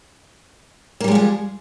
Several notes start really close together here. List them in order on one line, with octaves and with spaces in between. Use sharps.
A#3 G3 G#3 F3 G#4